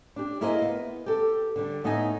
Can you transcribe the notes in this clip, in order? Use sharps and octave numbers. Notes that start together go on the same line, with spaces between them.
D4 G4
A#3 E4 G#4 A#4 C5 D#5
B3
G4 A4
D3 G3
A2 B3 D#4 D#5 E5 G#5